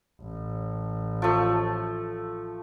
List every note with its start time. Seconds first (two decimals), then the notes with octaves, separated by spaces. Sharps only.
0.22 A1
1.22 F3 A3